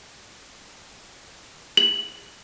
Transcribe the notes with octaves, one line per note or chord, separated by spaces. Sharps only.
F#7